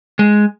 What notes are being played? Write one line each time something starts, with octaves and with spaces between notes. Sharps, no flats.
G#3